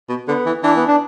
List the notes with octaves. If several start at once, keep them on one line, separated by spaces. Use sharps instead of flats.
B2
D3 B3
E3
E3 D4
B3
D4